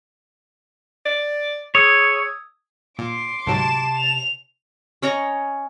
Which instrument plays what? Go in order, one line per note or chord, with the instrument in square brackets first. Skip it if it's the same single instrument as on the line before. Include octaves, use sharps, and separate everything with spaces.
[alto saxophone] D5
[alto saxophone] G#4 [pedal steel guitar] C#5 [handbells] D#6 E6 G#6
[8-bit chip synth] A#2 [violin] C6 D6
[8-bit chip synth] D2 G#2 F#3 [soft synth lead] C3 [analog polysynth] A5 E7
[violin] F7
[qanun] C#4 C#5 D#5 A#5